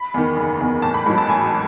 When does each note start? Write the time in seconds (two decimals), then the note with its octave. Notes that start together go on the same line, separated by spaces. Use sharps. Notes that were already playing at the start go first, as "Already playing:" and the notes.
Already playing: B5
0.14 E2 D#3
0.36 F#1
0.60 E2 D#3
0.82 A1 A5
0.94 B5
1.06 G#2 B5
1.10 F#3
1.18 A5
1.29 A1 G#5